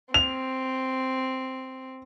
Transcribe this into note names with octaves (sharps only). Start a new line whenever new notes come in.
C4 F7